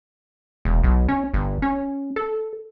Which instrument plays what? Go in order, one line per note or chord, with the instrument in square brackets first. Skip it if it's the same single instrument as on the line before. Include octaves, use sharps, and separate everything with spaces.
[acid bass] E1
B1
C#4
G1
C#4
A4